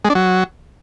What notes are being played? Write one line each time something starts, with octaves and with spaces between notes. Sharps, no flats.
G#3
D4
F#3